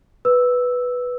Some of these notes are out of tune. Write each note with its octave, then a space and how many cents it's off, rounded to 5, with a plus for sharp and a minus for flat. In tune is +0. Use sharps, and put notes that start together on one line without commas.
B4 +0 E6 +0